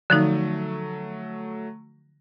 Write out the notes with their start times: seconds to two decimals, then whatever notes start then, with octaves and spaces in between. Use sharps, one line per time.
0.10 D3 F3 F#3 A3 D#4